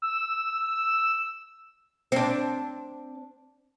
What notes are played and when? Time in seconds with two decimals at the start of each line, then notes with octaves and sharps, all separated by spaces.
0.02 E6
2.12 C4 D4